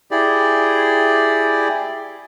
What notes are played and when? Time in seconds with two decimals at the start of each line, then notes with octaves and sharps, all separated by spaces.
0.11 E4 G4 G#4 D5